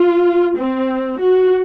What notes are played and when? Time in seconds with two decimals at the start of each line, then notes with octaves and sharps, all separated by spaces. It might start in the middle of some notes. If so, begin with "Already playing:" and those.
Already playing: F4
0.58 C4
1.20 F#4